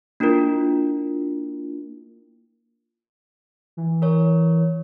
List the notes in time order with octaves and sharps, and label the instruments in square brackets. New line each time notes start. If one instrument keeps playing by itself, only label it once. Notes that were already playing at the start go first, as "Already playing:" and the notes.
[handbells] A#3 D4 E4 F4 A#4
[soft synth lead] E3
[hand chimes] A#4 C#5